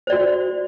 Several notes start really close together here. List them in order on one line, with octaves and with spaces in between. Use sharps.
C5 D5 F#4